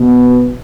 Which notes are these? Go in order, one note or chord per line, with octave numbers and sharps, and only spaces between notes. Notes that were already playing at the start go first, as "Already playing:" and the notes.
Already playing: B2